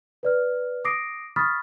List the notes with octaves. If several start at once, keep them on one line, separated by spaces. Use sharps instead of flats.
B4 D5 F6
D6 D#6 A#6 C7 D7
B5 C#6 D#6 F6 A6 B6